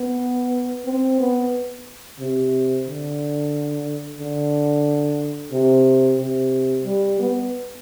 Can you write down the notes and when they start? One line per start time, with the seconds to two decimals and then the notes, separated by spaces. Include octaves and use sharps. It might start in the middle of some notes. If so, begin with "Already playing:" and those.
Already playing: B3
0.86 C4
1.20 B3
2.19 C3
2.87 D3
4.19 D3
5.52 C3
6.19 C3
6.85 G3
7.19 B3